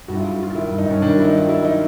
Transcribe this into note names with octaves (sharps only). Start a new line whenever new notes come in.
G2 F#4
E4
F4
F#3
F#4
F#3 F4
F4
D#3 E4
G2
D#4
G2 C#4
D#3 D4
F#3 E4
D#4
D#3 F4
F#3 E4
D#4